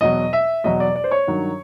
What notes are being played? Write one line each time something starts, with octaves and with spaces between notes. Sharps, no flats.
E2 B2 F#3 D#5
E5
E2 B2 F#3 D#5
D5
D5
C5
C#5
G2 D#3 F#3